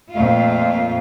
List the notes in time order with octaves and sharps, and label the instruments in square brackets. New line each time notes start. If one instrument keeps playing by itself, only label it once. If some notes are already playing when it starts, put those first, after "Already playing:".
[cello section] F2 A#2 A3 F4